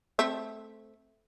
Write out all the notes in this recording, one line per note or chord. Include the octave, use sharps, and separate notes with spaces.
A3 C4 E5